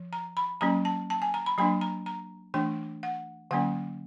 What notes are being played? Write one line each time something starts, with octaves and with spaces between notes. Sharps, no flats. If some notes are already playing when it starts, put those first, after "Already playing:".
Already playing: F3
A#5
B5
F#3 A#3 C#4 A#5
A5
A5
G#5
A#5
B5
F#3 A#3 D4 B5
A#5
A#5
E3 A3 D4 G5
F#5
D3 F#3 A#3 C#4 F#5